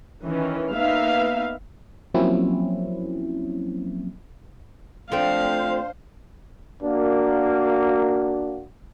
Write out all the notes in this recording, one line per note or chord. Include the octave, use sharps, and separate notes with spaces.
D#3 E3 C#4
A#3 B3 D#4 B4 E5 F5
F3 F#3 A#3 C4 C#4 E4
F3 A3 C4 D4 C5 F5
A#3 D4 F#4